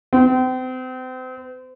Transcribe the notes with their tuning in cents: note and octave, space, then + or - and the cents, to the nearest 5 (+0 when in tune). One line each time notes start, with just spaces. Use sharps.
C4 -35